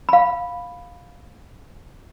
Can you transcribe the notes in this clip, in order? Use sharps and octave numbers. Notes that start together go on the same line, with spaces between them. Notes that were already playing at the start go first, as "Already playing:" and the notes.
F5 B5